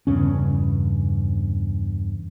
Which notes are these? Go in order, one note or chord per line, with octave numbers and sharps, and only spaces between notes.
E2 G2 C#3 C#4